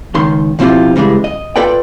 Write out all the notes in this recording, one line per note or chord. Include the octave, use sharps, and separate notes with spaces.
C#2 D#3 C6
B2 F3 C4 E4 F4 G4
C#3 E3 G3 G#3
D#5
F4 A4 B4 D5 G5